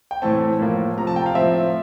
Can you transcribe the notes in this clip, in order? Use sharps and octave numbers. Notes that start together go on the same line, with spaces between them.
G5
A2 E3 A3 C4 A5
A2 F3 A#3
C3 F3 A3 A#5
A5
G5
F5
A2 F3 C4 E5